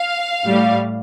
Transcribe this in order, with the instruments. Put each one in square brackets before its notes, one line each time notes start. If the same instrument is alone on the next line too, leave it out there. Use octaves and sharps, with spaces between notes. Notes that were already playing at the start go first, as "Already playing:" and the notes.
Already playing: [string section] F5
A2 G3